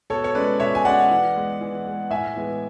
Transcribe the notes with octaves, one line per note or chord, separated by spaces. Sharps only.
B2 A4 C#5
C#5
G#3 C#4 B4 D5
B2 C#5 E5
G#5
G#3 C#4 D5 F#5
E3
G#3 B3
E3
G#3 B3
A2 E5 G#5
E3 G#3 B3